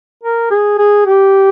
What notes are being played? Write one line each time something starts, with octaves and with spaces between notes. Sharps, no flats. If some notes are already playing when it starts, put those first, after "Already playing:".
A#4
G#4
G#4
G4